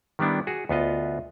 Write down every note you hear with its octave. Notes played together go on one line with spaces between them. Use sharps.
D#3 G3 B3 D4 E4
F#4 G#4
D2 B3 F4 D#5